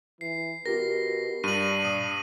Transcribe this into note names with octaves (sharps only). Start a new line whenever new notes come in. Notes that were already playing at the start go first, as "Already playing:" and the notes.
E3 C7
B2 F4 G4 A#4 A#6
G2 D4 D#7 F#7
A#2 D#6